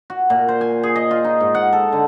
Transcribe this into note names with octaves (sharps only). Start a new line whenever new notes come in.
F#4
A#2
C5
G#5
G#4
D#5
F4
D#4
G#2
F#5
A4
D3